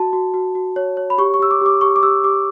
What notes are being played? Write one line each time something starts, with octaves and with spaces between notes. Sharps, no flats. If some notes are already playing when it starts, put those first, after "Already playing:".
Already playing: F#4 A5
F#4
F#4
F#4
C#5
C#5
B5
G4 C#6
C#6
G4 E6
D6
G4 D6
G4 C#6
D6
G4 E6
G4 D6